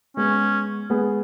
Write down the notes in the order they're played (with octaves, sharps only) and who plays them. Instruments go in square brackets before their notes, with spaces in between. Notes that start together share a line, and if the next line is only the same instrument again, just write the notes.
[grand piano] G#3 B3 G#4 [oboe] C#4
[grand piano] G#3 B3 G#4